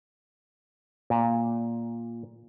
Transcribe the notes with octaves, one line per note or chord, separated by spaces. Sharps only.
A#2